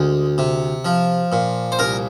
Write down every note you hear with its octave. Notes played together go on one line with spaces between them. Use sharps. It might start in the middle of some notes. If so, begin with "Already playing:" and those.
Already playing: D2 G#3
C3
F3
A#2
C5
C2 A#4